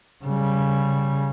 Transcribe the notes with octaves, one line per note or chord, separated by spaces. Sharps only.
C#3 G3